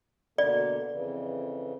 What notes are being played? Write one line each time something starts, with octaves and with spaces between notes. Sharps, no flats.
B2 D3 A#3 D5
F2 C#3 E3